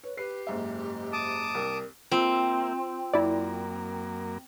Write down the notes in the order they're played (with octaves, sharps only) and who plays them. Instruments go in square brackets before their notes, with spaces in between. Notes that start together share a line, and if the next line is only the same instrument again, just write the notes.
[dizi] B4 [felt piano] C#5
[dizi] G4 [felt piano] B4 C7
[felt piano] F#1 G#2 E5
[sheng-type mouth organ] A5 D6 D#6
[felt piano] C2 [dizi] A#4
[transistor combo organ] A#3 E5 [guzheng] C4 [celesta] F4
[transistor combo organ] F#2 A#3 [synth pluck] E4 D5